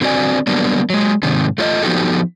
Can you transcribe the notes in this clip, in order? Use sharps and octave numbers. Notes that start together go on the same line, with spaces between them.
D3 C4 F#4 A4 D5 G#5
D3 F#3 G3 A#3 B3 D4
F#3 G#3
G#2 C3 D#3
A3 F4 C#5 D#5
F3 B3 D#4 F#4 G4 A4